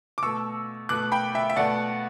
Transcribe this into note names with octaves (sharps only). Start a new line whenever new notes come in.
D6
B2 A3 C#6 E6
B2 A3 D6 F#6
G5 B5
E5 G5
E5
B2 A3 D5 F#5